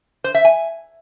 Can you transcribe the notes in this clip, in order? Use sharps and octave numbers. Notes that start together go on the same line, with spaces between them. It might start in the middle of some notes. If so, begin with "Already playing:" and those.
C5
E5
G#5